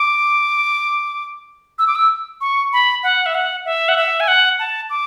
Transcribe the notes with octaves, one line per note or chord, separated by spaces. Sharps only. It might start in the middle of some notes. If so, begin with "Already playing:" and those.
Already playing: D6
E6
D6
E6
C#6
B5
F#5
E5
F#5
E5
F#5
E5
G#5
F#5
A5
D6